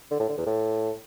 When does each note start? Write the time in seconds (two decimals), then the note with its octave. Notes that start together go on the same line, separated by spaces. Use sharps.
0.11 D3
0.20 A2
0.29 D3
0.38 E2
0.46 A2